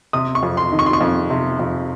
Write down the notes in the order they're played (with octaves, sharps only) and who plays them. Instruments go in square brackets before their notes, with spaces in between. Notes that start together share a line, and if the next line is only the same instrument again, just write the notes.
[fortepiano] C3 D#6
C#6
F2
C6
D#3
C#6
C6
C#6
F2
C3
F2